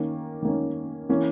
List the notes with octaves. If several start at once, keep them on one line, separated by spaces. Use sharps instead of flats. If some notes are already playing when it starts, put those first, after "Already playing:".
Already playing: D#3 A#3 C#4
D#3 A#3 C#4
E3 A#3 C#4